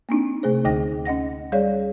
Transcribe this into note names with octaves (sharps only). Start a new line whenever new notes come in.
A#3 C4 D4 D#4
C3 A3 G#4 C5
D2 D3 D#4 G5 A#6
C#4 D#5 F#5 A#6
G3 G#4 C#5 D5 F5